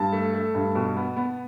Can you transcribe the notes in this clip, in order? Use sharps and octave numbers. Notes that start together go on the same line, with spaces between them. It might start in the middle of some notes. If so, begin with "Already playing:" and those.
Already playing: G2 A5
A3
A3
G2
B2
B3
B3